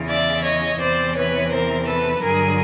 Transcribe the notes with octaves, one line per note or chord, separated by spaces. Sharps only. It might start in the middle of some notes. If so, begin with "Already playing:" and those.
Already playing: E2 C#3 E3
D5 E5
C#5 D#5
E2 C3 E3 C5 D5
B4 C#5
A#4 C5
A4 B4
G2 D3 F#3 G#4 A#4